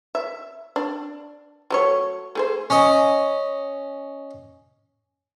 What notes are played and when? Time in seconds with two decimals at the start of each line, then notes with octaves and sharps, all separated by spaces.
0.15 E5
0.76 D4
1.70 F#3 A3 C#5
2.35 A3 G#4 C5
2.70 C#4 D#5